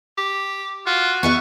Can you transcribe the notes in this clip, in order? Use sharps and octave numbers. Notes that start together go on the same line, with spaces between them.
G4
F4 F#4
B3 B4 E5 C#6